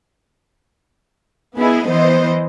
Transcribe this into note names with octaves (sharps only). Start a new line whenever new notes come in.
B3 E4 G#4 D#5
E3 B3 C5 D#5